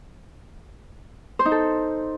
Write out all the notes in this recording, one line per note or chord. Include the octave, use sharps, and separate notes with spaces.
C5
D#4
A4